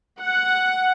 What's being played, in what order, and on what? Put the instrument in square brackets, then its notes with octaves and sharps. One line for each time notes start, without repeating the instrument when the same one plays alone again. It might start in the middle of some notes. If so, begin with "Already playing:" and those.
[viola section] F#5